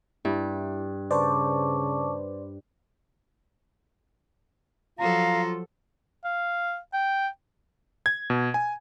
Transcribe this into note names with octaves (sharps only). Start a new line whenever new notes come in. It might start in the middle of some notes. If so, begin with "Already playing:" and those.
G2 E4
C#3 B4 C5 D5 A5 C#6 D6
F3 F#3 F4 A4 F5 A#5
F5
G5
G#6
B2
G#5